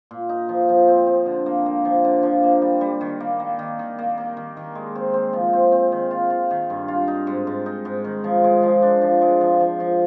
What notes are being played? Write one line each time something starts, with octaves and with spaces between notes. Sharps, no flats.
A#2
D#4
F3
F3
C4
C4
D3
A#3
A#3
F3
D3
F3
A#3
G3
G3
D#3
A#3
A#3
D#3
D#3
A#3
A#3
D#3
D#3
G#3
C4
C4
F3
C4
C4
D#3
F4
F4
D#3
G2
F4
D#4
G#2
G#2
D#4
G#2
D#3
F3
G#3
F3
D4
F3
G#3
F3
F3
F3